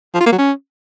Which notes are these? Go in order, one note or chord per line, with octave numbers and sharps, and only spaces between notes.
F3
F4
A#3
F#3
C#4